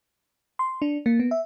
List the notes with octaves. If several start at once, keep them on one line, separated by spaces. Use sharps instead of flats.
C6
D4
A#3
B3
E5